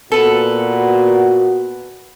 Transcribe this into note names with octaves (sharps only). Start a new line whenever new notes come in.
A#2 B3 F#4 A4 B4